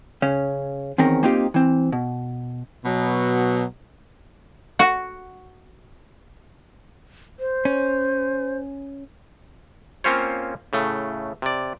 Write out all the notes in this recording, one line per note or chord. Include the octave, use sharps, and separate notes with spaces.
C#3 C#4
E2 D#3 C4 C#4 A#4
A#3 C4 D#4 F4 G4
E3 C4
B2
B2 F#3
F#4 F#5
C5
C#4
A#3 C4 C#4 F4 C5 C#5
A2 C#3 A3
C3 D5